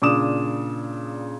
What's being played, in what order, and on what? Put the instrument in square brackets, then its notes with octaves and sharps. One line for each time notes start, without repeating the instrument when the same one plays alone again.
[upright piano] A#2 C#3 D4 D6 D#6 E7